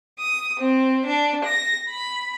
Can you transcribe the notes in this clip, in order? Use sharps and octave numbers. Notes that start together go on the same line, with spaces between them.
D#6
C4
D4
A#6
B5